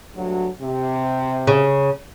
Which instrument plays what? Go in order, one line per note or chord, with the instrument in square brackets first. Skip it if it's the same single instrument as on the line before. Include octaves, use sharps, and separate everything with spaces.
[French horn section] D2 G2 F#3
C3
[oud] C#3